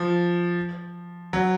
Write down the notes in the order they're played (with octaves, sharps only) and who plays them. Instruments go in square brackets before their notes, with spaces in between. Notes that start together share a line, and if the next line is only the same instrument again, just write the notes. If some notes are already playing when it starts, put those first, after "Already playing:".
Already playing: [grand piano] F3
F#3